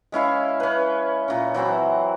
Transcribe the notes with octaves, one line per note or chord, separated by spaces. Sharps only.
G#3 C#4 E4 F5
C#4 B4
A#2 C#4
E3 F#3 C4 E4